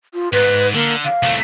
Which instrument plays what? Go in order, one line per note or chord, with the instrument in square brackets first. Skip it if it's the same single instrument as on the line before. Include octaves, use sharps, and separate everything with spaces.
[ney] F4
[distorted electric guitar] G#2 [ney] B4
[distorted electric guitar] D3 [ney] A#3
[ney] F5
[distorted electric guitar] C2 A3